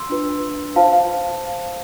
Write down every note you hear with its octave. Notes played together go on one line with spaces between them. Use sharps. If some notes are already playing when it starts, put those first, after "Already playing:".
Already playing: C6 E6
D4 F4 B4
F4 C5 F5 A5
F5